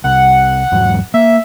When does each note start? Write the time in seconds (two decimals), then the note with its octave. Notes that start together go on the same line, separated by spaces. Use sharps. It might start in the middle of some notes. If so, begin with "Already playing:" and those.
0.04 C2 F#5
0.71 E2 G#2 F#3
1.14 A#3 E5